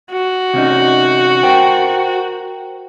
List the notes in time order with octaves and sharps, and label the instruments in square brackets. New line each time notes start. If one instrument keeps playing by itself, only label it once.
[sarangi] F#4
[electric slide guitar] C3 C#4 D#4
A#4 C5 G5